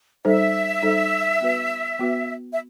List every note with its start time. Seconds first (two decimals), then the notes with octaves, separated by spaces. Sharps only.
0.25 G3 D#4 A4 C5 E5
0.83 G3 D#4 A4 C5
1.41 B3 F#4 B4
1.99 B3 F#4 B4
2.52 E5